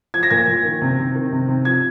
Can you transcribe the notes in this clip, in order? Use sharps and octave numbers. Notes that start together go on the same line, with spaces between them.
F3 G#6
A#6
A#2 G#6
A#2
D#3
C3
C3
D#3
C3
C3
F3 G#6